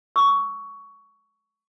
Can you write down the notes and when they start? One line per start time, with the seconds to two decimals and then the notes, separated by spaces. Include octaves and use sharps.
0.16 C#6 E6